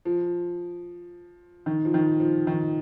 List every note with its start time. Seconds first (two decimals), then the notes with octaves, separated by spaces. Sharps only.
0.05 F3
1.66 D#3
1.85 F3
1.94 D#3
2.20 F3
2.47 D#3